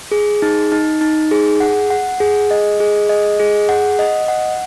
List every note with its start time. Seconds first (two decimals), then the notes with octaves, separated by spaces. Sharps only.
0.11 G#4
0.42 D#4
0.72 D#4
1.01 D#4
1.31 G#4
1.60 F#5
1.90 F#5
2.20 G#4
2.51 D#5
2.80 G#4
3.09 D#5
3.40 G#4
3.69 F#5
3.99 D#5
4.28 F#5